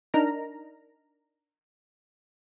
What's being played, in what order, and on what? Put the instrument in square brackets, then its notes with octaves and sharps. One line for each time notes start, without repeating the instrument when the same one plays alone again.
[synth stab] D4 D#4 A#4 A#5